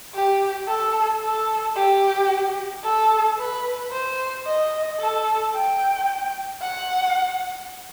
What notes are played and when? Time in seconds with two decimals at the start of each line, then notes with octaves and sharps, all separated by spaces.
0.14 G4
0.68 A4
1.23 A4
1.76 G4
2.84 A4
3.38 B4
3.92 C5
4.47 D#5
5.00 A4
5.54 G5
6.62 F#5